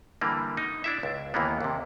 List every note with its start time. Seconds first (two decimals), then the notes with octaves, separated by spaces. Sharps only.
0.21 D3 E3 G3 A#3
0.57 D#4
0.84 D4 E4 E5
1.03 C#2
1.34 D#2 E3 A#3 B3
1.61 D#2 C3